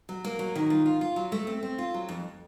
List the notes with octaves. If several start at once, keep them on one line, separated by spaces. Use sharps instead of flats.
F#3
A#3
F#3
D#3
F4
F4
F4
F#3
A3
C4
C4
F4
F#3
F2